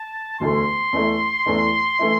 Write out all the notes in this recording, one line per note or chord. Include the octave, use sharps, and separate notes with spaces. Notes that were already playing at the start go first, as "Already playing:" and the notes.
Already playing: A5
E1 D2 D3 A3 C6
E2 E3 A3 E4
E2 E3 A3 E4
E3 A3 E4